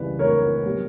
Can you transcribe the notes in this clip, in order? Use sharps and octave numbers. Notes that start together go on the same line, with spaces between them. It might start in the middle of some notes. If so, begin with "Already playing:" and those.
Already playing: C#2 C#3 E3 G3 B4 D5
A#4 C#5
B2 G3